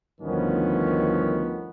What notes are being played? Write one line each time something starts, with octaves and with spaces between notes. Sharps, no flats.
D2 G2 D#3 F3 B3 C#4